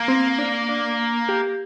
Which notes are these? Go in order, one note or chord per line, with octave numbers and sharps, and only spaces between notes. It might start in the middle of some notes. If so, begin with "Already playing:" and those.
Already playing: A#3
C4
D4
D4
G4